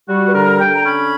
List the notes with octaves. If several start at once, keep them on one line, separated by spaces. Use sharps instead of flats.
G3 F#4
B4
D3 A#4
D3 G5
A#5
C#4 B5